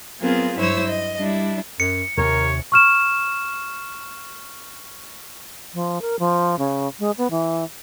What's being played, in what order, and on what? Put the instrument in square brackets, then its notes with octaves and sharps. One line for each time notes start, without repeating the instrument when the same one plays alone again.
[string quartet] F#3 B3 C4 F4 G#4 A#4
G2 F#3 E4 C5 C#5 E6
D#5
G3 D4 E4
[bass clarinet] F#2 [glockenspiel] C#7
[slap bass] D#2 C3 [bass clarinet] A#4 [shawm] C#5
[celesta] C#6 F6 E7
[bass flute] F3
A#4
F3
C#3
G#3
B3
E3